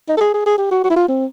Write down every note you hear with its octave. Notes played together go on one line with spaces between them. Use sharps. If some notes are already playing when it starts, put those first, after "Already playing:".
D#4
A4
G#4
G#4
G#4
G4
F#4
F#4
E4
F4
C4